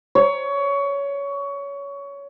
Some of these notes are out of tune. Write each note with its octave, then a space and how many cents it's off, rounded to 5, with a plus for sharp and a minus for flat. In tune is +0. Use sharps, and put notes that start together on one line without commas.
C#5 +20